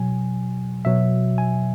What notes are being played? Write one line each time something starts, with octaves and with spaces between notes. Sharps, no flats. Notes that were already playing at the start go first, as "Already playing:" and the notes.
Already playing: B2 F#3 G#5
B2 F#3 E5
G#5